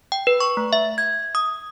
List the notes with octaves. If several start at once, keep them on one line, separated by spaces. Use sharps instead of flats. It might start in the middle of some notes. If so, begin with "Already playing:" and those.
G5
B4
C#6
A3
E5
G#6
D#6